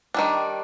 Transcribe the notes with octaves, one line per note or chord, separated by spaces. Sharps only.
D#3 G3 D4